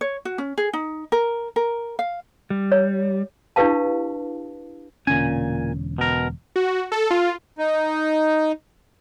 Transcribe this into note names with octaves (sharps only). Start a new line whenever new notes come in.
C#5
F#4
C#4
G#4
D#4
A#4
A#4
F5
G3
C#5
D4 E4 G4 B4 F5 A5
E1 A#2 D3 C#4 G#5
B2 A#4
F#4
A4
F4
D#4